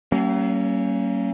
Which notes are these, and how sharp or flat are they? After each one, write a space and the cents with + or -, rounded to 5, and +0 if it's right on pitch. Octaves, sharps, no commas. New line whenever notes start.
F#3 +40 A#3 -30 C#4 +0